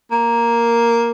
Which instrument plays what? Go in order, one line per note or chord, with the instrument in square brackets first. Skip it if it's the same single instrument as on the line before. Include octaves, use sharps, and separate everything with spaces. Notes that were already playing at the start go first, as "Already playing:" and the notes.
[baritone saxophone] A#3